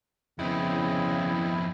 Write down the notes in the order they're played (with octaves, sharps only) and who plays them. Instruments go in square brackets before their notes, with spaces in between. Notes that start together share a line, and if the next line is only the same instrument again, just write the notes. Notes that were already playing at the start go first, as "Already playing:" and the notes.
[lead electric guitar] F2 B3 [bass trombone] C#3 [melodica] C4 D#5 [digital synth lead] E4